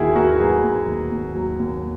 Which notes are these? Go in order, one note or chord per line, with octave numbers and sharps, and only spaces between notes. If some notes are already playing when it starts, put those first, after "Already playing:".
Already playing: D#2 D#3 E4 F#4 G#4
D#2 F#4 A#4
F#3 G#4 B4
D#2
D#3
D#2
F#3
D#2